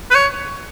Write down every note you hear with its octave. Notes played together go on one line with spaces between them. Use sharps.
B4
C#5